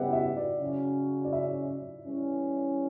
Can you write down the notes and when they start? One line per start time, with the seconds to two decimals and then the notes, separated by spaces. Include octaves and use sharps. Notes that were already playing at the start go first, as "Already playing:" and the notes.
Already playing: C#3 G3 B3 E4 G4 E5 F#5 G5
0.13 E5
0.37 D5
0.60 C#3 F#3 C#4
1.25 D5
1.33 E5
2.05 E3 G3 C#4